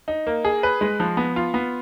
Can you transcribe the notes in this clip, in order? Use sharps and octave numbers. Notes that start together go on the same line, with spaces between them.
D#4
A#3
G#4
B4
G#3
F3
B3
F4
B3